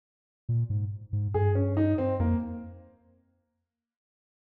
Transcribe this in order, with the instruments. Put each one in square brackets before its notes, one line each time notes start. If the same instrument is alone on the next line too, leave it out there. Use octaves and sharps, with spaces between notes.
[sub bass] A#2
G#2
G#2
[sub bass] G2 [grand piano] G#4
[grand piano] C#4
D#4
C4
[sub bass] F2 [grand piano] A#3